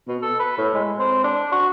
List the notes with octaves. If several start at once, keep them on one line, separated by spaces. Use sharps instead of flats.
B2
A4
B4
A2
G#3
C4
D4
F#4